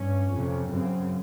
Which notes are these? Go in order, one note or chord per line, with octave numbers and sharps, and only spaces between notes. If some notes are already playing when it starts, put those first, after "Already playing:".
Already playing: G2 C#4
F2 C3
F#2 C#3 C4